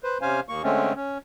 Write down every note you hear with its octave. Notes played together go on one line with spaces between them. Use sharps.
B4 C5
C3 C#4 C5 F5 G#5
D#2 A#3 C#6
D3 G#3 A3 C4 C#4
C#4